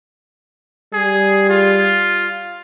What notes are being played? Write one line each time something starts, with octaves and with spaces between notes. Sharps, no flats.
G3 G#4
F4